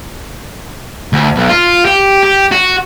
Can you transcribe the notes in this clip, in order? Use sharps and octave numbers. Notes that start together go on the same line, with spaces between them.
D2
B1
F4
G4
G4
F#4